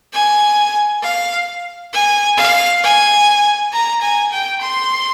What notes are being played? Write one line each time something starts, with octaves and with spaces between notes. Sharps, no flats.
G#5
F5
G#5
F5
G#5
A#5
G#5
G5
C6